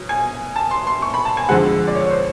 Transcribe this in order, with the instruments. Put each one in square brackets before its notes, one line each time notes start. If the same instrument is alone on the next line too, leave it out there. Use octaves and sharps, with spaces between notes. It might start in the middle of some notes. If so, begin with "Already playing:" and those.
Already playing: [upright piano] B2 F#3
G#5
A5
C6
C6
C#6
B5
A5
G#5
F2 D3 F3 G#3 F#5
D5
C#5
C#5
C5